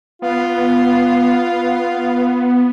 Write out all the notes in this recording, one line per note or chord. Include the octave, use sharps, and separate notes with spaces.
B3 F4